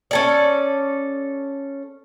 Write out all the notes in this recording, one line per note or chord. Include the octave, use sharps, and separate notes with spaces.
C#4 A4 D5